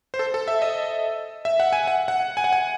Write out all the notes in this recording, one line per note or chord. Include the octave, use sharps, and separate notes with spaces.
C5
A4
A4
E5
D#5
E5
F#5
G#5
F#5
F#5
G#5
F#5
G#5